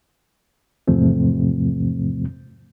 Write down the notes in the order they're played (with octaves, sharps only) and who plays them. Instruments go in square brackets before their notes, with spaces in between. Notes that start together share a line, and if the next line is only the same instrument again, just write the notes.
[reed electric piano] E2 G#2 C3 F3 A3 C4